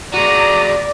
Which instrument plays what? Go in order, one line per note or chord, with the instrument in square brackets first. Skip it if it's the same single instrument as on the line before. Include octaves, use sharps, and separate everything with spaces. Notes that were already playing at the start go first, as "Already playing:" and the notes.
[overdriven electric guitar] G#3 F#4 [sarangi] D5 [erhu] A#5 [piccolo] D#7